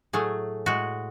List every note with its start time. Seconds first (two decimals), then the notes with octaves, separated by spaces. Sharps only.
0.13 A2 F#3 A3 G#4
0.66 A2 G#3 F#4